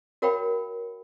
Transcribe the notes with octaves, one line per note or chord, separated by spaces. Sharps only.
F#4 A#4 C#5 F5 G5 B5